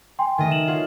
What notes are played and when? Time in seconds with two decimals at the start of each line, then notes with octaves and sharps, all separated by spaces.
0.19 G5 G#5 C6
0.38 D#3 A3 D#5
0.51 E7 F#7
0.67 F4 C#5 F#5